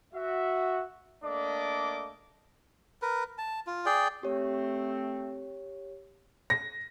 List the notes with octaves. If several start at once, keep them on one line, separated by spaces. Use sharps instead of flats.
F#4 E5
A3 A#3 D4 D5 D#5 D6
A#4 B4
A5
F4
G#4 D5 G5
A3 C4 G4 C#5
A#6